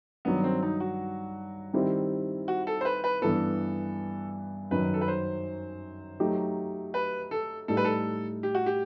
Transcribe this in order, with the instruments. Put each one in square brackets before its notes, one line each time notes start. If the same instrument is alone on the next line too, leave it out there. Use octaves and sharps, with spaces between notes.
[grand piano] G2 D#3 F#3 [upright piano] B3
[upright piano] C4
D#4
F#4
[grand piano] D#3 G3 C4 E4 G4
[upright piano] F#4
A4
C5
B4
B4
[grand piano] G2 E3 B3 [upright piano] A4
[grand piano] F#2 D#3 F#3 [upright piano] B4
[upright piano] A4
B4
C5
[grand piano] F#3 A3 D#4 G4
[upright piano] B4
A4
[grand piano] A2 G3 D#4 [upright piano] A4
[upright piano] B4
A4
G4
F#4
G4